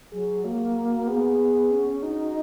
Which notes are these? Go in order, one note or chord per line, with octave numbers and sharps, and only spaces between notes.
F#3 G#4
A#3 F#4
B3 G#4
C#4
D#4 F#4